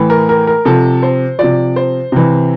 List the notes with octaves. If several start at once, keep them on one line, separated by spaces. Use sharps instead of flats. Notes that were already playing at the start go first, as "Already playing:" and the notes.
Already playing: A2 E3
A#4
A#4
A#4
C3 F3 A4
C5
C3 F3 D5
C5
C3 E3